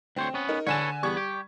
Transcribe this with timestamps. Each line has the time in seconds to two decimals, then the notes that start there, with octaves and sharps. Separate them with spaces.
0.16 D2 C4 C5 C#5
0.34 B3 C#4
0.49 D#4 A#4
0.67 D3 A4 B4 C#5 G#5 E7
1.03 E2 G3 B3 C#6 G#6
1.17 G4